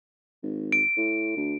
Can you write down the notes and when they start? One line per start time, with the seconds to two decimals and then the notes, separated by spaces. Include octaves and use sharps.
0.42 G#1
0.72 D7
0.97 A2
1.37 D2